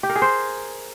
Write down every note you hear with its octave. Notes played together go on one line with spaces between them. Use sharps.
G4
A#4
G#4
C5